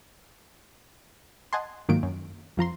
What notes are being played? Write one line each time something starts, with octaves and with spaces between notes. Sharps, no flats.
D#5 F#5 G#5 A5 C6
G#2 D#3 F#3 A#3 F4 D7
F#2
F2 F3 A#5 C6